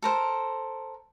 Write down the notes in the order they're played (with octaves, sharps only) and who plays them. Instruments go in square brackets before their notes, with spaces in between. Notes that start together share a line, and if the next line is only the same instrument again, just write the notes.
[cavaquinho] A4 A#4 C5